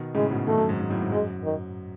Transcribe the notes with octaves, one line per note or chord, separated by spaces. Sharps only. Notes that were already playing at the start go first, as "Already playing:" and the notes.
Already playing: B2 D#3
A2 C#3 G#3
G#2 B2
B2 D#3 A3
F#2
G#2
G#2
F#2 A2
G#2
F#2 G#3
D#3